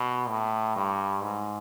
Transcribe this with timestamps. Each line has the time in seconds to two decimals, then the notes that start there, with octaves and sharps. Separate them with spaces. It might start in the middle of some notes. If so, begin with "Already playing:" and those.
Already playing: B2
0.29 A2
0.76 G2
1.23 G#2